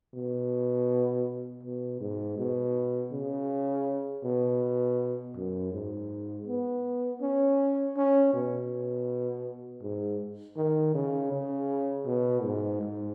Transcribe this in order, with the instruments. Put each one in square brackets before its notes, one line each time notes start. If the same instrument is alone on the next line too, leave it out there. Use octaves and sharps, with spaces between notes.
[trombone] B2
B2
G#2
B2
C#3
B2
F#2
G#2
B3
C#4
C#4
B2
G#2
D#3
C#3
C#3
B2
G#2
G#2